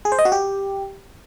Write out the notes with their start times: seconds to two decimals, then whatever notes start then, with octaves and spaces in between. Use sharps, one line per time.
0.05 G#4
0.12 C5
0.19 D#5
0.25 F#4
0.32 G4